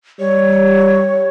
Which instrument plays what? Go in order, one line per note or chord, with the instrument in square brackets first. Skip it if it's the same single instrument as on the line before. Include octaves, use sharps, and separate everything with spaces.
[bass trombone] G3 [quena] C#5